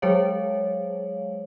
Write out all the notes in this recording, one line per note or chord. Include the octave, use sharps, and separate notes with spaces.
F#3 G#3 G#4 C5 C#5 F5